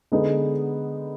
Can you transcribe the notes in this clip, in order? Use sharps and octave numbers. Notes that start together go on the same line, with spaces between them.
D3 G#3 B3 D#4